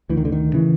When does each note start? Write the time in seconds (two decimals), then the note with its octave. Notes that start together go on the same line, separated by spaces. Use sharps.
0.10 D2 E3
0.17 D#3
0.25 D3
0.32 D#3
0.54 C#3 E3